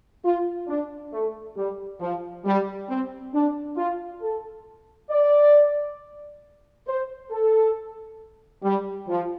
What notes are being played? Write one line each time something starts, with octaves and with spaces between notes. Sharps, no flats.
F4
D4
A3
G3
F3
G3
C4
D4
F4
A4
D5
C5
A4
G3
F3